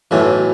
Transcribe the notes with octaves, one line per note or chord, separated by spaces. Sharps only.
B1 A2 E3